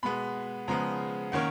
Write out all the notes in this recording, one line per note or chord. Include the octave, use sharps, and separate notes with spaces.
B2 G#3 B3 B5
C#3 F3 G#3 B3 A#5
D#3 A#3 C#4 F#5